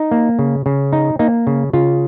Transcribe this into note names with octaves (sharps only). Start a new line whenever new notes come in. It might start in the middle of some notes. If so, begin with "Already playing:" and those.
Already playing: D#4
A#3
C#3
C#3
D#4
A#3 D#4
C#3
C#3 F4